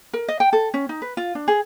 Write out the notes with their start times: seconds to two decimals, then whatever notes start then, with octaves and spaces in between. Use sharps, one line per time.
0.14 A#4
0.28 D#5
0.40 G5
0.53 A4
0.74 C#4
0.89 D#4
1.02 B4
1.17 F4
1.35 D4
1.48 G#4